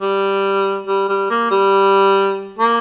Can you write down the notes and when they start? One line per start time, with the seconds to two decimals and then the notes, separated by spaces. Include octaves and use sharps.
0.02 G3
0.87 G3
1.09 G3
1.30 A#3
1.51 G3
2.58 A#3